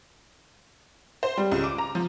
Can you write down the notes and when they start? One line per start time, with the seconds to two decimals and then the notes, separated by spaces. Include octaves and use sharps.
1.23 C5
1.37 G3
1.52 C#2
1.64 D6
1.78 A#5
1.95 F3